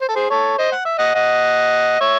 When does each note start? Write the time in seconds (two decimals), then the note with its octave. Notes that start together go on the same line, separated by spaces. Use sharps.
0.01 C5
0.08 A4
0.15 G#4 C5
0.30 A4 C#5
0.58 C5 D#5
0.72 F#5
0.85 E5
0.98 D#5 F#5
1.15 D#5 F#5
2.00 C#5 E5